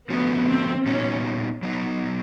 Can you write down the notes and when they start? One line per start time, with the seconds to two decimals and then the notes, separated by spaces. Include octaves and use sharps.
0.10 D3 F3 A3 B3 C#4 F#4
0.48 C4
0.86 A#2 G3 B3 C#4 D#4 F#4
1.63 F#3 B3 D#4